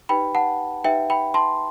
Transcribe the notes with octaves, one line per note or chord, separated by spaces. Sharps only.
D#4 G4 B4 G5 B5
F#5 A5
D#4 G4 B4 E5 G5
G5 B5
A5 C6